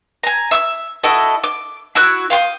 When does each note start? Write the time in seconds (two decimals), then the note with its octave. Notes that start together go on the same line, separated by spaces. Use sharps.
0.23 G#5 A#5
0.51 E5 D6 E6
1.04 E4 F#4 A4 D#5
1.44 D6
1.95 E4 F#4 E6 F#6
2.30 F5 G5 C6 D#6